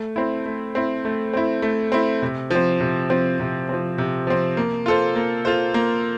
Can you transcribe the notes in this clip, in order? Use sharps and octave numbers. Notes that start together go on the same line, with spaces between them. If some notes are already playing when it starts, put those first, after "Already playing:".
Already playing: A3
C4 E4
A3
C4 E4
A3
C4 E4
A3
C4 E4
C3
F3 C4
C3
F3 C4
C3
F3 C4
C3
F3 C4
A#3
F4 A4 C5
A#3
F4 A4 C5
A#3